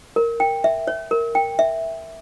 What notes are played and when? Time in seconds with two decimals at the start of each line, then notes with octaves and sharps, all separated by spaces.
0.16 A#4
0.40 G5
0.64 E5
0.87 C#5
1.11 A#4
1.35 G5
1.59 E5